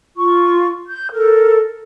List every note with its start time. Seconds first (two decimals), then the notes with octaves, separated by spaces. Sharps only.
0.16 F4 C#6
0.87 G6
1.13 A4 A#4